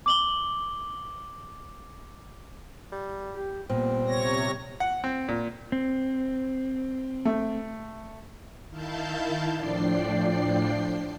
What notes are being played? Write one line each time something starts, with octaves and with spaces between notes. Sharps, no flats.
D6 F#7 G7
G3
G4
A#2 G3 B3 C4
C3 C#5 A#6
F#5
C4
A#2
C4
A3
D#3 E4 F5 A5 G6
A2 F3 D4 D5 G5 C7